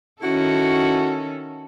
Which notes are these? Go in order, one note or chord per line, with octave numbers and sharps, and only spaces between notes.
D#3 C#4 E4 F#4 A4